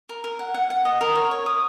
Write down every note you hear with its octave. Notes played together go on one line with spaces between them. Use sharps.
A#4
A#4
F#5
F#5
F#5
D#5
A#4
C#5
C#5
D#6